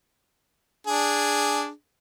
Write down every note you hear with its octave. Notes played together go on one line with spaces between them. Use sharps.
D4 G#4